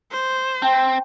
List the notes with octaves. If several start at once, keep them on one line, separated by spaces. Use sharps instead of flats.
C5
C4 G5 A5